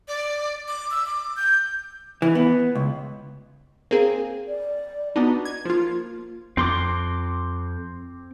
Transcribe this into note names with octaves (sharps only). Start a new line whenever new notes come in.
D5
D6
E6
D6
G6
E3
B3
C#2
A#3 C4 G#4
D5
B3 D4 D#4 F#4
G#6
F3 A#3 F4
F2 C4 C6 D6